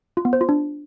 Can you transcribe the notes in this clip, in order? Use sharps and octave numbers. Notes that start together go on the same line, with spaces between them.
F4
B3
C5
F4
D4